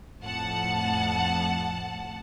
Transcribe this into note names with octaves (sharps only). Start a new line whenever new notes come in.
F2 A2 F#5 A5